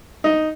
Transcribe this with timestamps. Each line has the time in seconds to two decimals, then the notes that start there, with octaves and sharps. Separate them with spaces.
0.24 D#4